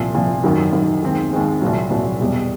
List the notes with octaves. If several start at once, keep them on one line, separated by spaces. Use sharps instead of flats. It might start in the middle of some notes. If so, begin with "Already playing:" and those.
Already playing: C2 A#2 F3
C2 A#2 F3
F#2 D#3 F#3
F#2 D#3 F#3
D#2 D#3 G#3 C4
D#2 D#3 G#3 C4
C2 A#2 F#3
C2 A#2 F#3
E2 B2 G3